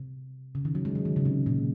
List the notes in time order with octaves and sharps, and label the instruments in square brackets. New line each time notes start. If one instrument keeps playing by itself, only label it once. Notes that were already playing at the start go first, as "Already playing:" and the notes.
Already playing: [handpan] C3
C#3
D#3
F#3
G#3
F#3
D#3
C#3
C3
A#2